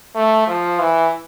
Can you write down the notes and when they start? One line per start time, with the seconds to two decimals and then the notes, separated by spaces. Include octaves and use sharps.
0.15 A3
0.48 F3
0.79 E3